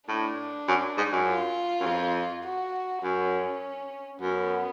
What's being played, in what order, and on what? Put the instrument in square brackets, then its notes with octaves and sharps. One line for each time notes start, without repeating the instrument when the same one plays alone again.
[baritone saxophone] A2 [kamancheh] D4
[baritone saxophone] F#2
G#2
F#2
[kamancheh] F4
[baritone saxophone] F#2
F2
[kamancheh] F#4
[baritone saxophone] F#2 [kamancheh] C#4
[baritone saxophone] F#2 [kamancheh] B3